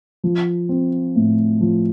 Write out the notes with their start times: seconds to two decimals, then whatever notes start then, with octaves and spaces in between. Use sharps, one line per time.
0.24 F3
0.69 C4
1.16 A2
1.61 F3